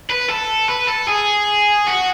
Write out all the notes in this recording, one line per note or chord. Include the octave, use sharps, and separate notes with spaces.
B4
A4
B4
A4
G#4
F#4